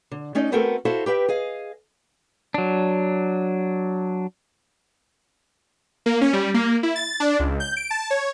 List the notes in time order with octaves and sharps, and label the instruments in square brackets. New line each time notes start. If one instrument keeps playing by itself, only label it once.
[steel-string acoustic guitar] D3
A3 C#4 D#4 D5 D#5
A3 B3 C4 F#4 A4 A#4
E4 F#4 A4 C5 E5 F5
G4 B4 E5 F#5 G5
G#4 D#5 F5
[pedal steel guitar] F#3 D4
[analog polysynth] A#3
C#4
G3
A#3
E4
A6
D4
C#2
G6
D7
A5
C#5